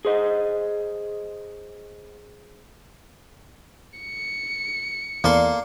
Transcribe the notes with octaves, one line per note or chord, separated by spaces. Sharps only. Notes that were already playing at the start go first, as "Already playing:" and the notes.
G#4 C5 D#5
C#7
E2 A#3 A4 D5 C6